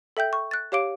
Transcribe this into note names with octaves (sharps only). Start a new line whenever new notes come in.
A4 E5 G5 G6
C#6
F#6 A6
G4 C#5 F5 D6 D7